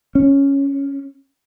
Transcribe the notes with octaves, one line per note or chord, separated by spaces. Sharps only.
C#4